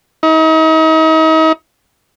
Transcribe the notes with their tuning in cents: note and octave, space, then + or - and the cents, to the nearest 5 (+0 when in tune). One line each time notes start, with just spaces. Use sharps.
D#4 +40